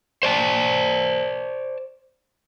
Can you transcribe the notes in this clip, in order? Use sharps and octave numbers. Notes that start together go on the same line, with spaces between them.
C5 D5 A5